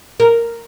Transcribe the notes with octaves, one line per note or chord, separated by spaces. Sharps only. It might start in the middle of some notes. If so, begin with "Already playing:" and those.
A#4